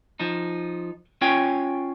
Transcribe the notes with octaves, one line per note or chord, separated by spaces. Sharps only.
F3 D#4
C#4 F4 C#5 G5 G#5